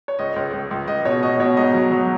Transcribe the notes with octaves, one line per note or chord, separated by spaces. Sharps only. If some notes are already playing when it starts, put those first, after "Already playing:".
C#5
C#2 D#5
C#2
C#2
C#2
C#2 D#5
B2 C#5
B2 D#5
B2 C#5
G#2 D#5
F#3
F#3